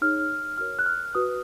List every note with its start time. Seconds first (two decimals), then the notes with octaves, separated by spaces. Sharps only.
0.02 D#4 G#4 C#5 F6
0.58 F#4 A#4 C#5 F6
0.79 F#6
0.86 F6
1.15 F#4 B4 D#6